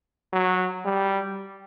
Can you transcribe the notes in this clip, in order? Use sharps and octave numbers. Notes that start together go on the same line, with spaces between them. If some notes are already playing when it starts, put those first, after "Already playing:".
F#3
G3